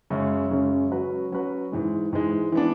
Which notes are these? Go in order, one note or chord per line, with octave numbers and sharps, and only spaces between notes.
F#2 C#3 G#3 C#4
F#2 C#3 G#3 C#4
F#3 C#4 F#4 B4
F#3 C#4 F#4 B4
G#2 E3 G#3
G#2 E3 G#3
E3 B3 D4